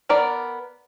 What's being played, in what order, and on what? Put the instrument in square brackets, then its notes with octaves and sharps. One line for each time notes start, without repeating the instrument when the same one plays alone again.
[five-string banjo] B3 A#4 D5